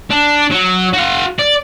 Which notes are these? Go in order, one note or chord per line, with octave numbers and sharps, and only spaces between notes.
D4
F#3
F#4 F5
D5